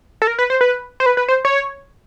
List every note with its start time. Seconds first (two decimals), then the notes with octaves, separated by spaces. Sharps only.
0.22 A4
0.27 A#4
0.39 B4
0.50 C5
0.61 B4
1.00 C5
1.06 B4
1.17 B4
1.28 C5
1.45 C#5